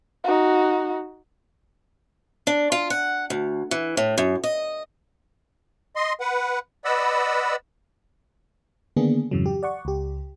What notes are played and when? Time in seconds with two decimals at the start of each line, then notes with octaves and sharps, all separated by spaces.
0.24 D#4 F#4
2.47 D4
2.72 F4
2.90 F#5
3.30 D2
3.71 E3
3.97 A2
4.18 F#2
4.44 D#5
5.96 D#5 C6
6.20 B4 F#5
6.85 B4 D5 D#5 F#5 B5 E6
8.96 D3 D#3 A#3 B3 D4 G#4
9.31 F2 G#2 C#3 E3 F#3
9.46 G4
9.63 D5 F#5 C#6
9.85 C#2 G4